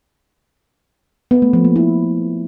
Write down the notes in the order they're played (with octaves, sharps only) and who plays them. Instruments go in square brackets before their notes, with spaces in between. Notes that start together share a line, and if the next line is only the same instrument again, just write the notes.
[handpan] B3
A3
F3
A#3
E4